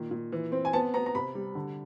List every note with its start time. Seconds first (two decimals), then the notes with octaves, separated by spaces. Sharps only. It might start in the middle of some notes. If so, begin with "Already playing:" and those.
Already playing: A#2 D#3
0.11 A#2
0.32 E3
0.52 C4
0.65 G#5
0.73 B3 A5
0.94 B3 A#5
1.06 A#5
1.15 C3 B5
1.35 G3
1.55 D3